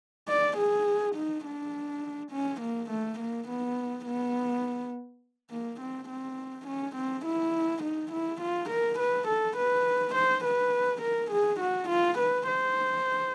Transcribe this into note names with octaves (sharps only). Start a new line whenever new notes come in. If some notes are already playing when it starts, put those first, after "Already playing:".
D5
G#4
D#4
D4
C#4
A#3
A3
A#3
B3
B3
A#3
C4
C4
C#4
C4
E4
D#4
E4
F4
A#4
B4
A4
B4
C5
B4
A#4
G#4
F#4
F4
B4
C5